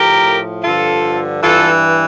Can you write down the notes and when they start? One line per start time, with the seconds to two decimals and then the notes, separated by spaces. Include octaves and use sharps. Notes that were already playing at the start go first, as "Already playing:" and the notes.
Already playing: A2 F3 G4 A#4
0.64 G2 D3 F3 F4 A4
1.42 G2 E3 F4 A4